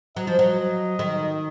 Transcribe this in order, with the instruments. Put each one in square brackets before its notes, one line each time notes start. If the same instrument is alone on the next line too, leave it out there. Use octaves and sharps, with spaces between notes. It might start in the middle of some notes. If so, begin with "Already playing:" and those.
[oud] F#3 [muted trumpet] D#5
[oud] F3
F#3
D#3